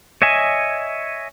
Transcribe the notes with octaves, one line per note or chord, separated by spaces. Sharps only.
C#5 D#5 E5 G#5